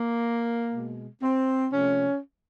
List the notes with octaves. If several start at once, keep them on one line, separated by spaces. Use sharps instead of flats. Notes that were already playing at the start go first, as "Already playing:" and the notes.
Already playing: A#3
B2 G#3
C4
C3 F3 A3 C#4